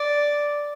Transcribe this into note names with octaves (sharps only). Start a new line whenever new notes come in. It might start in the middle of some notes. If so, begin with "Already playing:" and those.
Already playing: D5